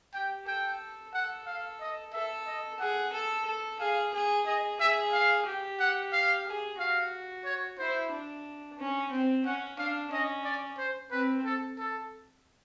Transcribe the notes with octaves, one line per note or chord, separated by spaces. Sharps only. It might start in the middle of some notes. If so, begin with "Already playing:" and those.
G4 G5
A4 G5
A4 F#5
F5
D#5
A4 E5
D#5
G#4 F#5
A4
A4
G#4 F5
G#4
G#4 D#5
G#4 E5
F5
G4
F#5
F5
G#4
F#4 F5
C#5
E4 C5
D4
C#4
C4
C#4 F#5
D4 F5
C#4 D#5
D5
C5
C4 B4
A4
A4